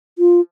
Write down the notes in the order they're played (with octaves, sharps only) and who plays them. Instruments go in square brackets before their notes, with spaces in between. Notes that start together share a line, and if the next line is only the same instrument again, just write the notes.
[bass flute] F4